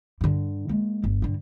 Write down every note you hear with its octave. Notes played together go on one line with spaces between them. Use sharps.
G2 D3
G#3 A#3
G1
G2 D3